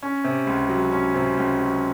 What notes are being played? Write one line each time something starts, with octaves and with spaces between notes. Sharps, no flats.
C#4
C3
C#2
F#3
C#4
C3
C#2
F#3